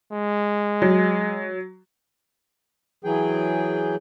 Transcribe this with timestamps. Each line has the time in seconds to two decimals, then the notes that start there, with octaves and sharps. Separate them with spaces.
0.12 G#3
0.82 F#3
3.04 E3 F#3 G#4 G5